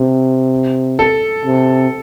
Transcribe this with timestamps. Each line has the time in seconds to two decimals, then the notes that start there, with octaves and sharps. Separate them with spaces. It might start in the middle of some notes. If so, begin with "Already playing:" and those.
Already playing: C3
0.99 A4
1.45 C3